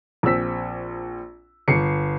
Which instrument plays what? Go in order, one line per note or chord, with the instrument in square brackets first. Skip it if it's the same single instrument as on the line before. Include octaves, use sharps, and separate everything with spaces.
[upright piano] A#1 C4 E6 B6
G1 C7 C#7